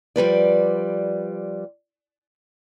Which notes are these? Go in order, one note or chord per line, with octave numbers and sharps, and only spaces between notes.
F3 G3 B4 D5